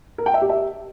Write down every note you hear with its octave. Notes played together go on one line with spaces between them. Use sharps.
A#4
G5
E5
G4
E5